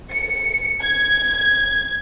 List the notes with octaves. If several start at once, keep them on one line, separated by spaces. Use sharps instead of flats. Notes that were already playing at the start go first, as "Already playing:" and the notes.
C#7
G#6